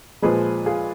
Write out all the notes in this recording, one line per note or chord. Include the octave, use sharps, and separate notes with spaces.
A#2 F3 G#3 G#4 B4
F4 G#4